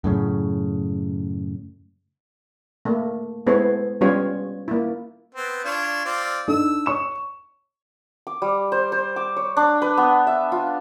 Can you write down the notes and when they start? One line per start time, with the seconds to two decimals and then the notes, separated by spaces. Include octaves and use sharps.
0.04 F#2 A2 C#3
2.85 A3 A#3
3.46 G#3 B3 E4 A4 C5 C#5
4.01 G3 B3 C#4 F4 G4 C#5
4.68 A#3 E4
5.35 B3 C4
5.64 D4 F4 C#5
6.05 C4 F4 D5
6.48 D4 D#4 A4 E6
6.86 C#5 C#6 E7
8.27 D6
8.42 G3
8.72 C5
8.92 C5
9.16 D6
9.37 C#5
9.57 D4
9.82 B4
9.97 B3
10.27 E5
10.52 F4